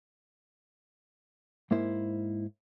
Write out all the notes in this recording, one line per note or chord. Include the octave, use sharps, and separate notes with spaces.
G#2 A#3 E4 C5